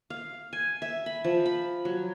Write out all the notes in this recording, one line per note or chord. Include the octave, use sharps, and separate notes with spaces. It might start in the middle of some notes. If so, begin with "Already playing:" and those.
F5
G#5
E5
B5
F3
B5
F#3